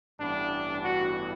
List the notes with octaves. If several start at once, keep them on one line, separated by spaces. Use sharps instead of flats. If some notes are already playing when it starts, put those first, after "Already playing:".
A1 G2 E3 B3 D4
F#4